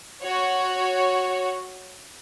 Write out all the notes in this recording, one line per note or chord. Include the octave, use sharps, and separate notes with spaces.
F#4 C#5